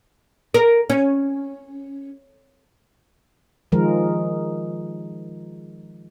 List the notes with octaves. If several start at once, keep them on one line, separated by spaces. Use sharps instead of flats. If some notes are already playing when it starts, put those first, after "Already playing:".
A#4
C#4
D#3 F3 G#3 A#4